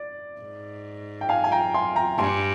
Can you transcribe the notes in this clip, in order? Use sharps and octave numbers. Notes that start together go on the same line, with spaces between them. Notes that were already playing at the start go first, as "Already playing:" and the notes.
Already playing: D5
G#2
G5
F5 G#5
G#5
G5 A#5
G#5 C6
G5 A#5
G2 G#5 C6